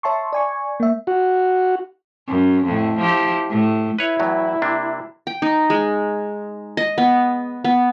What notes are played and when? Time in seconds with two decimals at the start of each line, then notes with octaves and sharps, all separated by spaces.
0.03 C#5 E5 A5 C6 C#6
0.33 D5 G#5 C#6
0.80 A#3 E5
1.07 F#4
2.28 F#2
2.66 F2 A2
2.98 F3 E4 G4
3.50 A2
3.99 E4 B4 C#5
4.20 E2 A2 F#3
4.62 C3 A#3 D4
5.27 G5
5.42 D#4
5.70 G#3
6.77 D#5
6.98 B3
7.64 B3